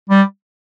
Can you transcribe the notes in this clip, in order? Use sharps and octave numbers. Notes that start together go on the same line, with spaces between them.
G3